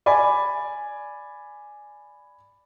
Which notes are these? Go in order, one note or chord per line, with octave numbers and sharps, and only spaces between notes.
D5 G#5 B5